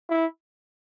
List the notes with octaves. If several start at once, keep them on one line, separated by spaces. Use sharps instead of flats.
E4